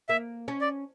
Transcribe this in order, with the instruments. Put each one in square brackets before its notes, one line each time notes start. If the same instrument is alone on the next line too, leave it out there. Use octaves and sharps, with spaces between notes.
[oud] A#3 [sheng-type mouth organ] E5
[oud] C#4
[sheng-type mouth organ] D5